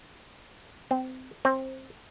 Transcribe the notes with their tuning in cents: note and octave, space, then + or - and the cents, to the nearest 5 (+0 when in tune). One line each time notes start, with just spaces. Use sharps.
C4 -20
C4 +20